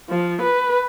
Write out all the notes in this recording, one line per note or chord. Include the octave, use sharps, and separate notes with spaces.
F3
B4